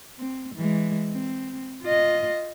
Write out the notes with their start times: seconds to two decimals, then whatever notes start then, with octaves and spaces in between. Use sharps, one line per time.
0.19 C4
0.55 E3 G#3
1.11 C4
1.83 F4 D#5